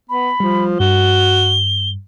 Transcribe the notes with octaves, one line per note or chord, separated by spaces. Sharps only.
B3 B5
F3 G3
G2 F#4 G7